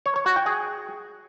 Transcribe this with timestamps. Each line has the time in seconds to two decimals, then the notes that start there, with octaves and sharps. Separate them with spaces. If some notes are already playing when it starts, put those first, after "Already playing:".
0.06 C#5
0.16 C#5
0.26 F#4
0.36 G5
0.46 G#4